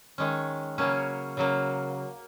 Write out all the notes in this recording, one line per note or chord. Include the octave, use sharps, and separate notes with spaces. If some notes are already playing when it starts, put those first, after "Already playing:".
D#3 G#3 C#4
C#3 F#3 A#3 C#4
C#3 F#3 A#3